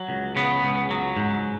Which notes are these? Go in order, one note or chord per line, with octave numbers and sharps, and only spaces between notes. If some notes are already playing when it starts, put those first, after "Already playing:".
Already playing: F#3
C#2
C#3 B3
C#2
F#3
G#2